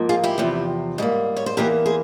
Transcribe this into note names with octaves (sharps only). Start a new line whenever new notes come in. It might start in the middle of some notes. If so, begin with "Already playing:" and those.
Already playing: G#2 F3 A#3
F4 G#4
E4 G4
E2 C3 F3
G#2 G3 A#3
C#5
C5
E2 E3 A#3 G4 A#4
G#4 C5